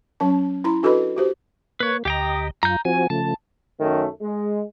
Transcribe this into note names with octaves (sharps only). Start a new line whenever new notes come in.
F#3 C#4 A5
E4 A#5 C6
D4 F#4 A4 B4 D#5 B5
F#4 G4 C5
A#3 B4 C#5
D2 G4 D#5 G5 A#5
F#2 F4 A#5 G6
F3 C4 F#4 G#5
C#3 F3 A3 A5
F#2 D#3 A3 C#4
G#3